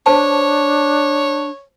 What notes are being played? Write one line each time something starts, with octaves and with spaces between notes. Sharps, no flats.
D4 C5 C#5 A5